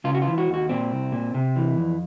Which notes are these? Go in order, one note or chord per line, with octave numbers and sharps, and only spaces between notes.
C#3 F4
F#4
F4
E3
F#4
D#2
F#4
A#2 C4
C2
A#2
C3
E3
F2